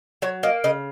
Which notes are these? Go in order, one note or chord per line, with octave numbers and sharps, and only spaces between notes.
F#3 C#5
A#3 D#5
C#3 D#5